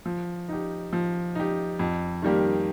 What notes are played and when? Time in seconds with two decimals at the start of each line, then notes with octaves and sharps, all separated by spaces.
0.06 F3
0.49 D#4 G4
0.93 F3
1.35 D#4 G4
1.79 F2
2.22 D#3 G3 A#3 G4